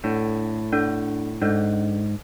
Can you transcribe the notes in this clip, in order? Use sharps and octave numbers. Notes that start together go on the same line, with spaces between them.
A2 D4 A4 D5 F#5
D4 A4 D5 F#5
G#2 D4 A4 D5 F#5